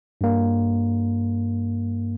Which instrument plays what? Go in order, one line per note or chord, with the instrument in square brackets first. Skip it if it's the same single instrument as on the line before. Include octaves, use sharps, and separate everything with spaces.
[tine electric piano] G2 A#3